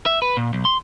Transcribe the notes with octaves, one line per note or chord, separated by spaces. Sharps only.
E5
B4
A#2
B1
C6